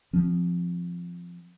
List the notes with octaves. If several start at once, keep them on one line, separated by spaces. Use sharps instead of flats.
F3 C4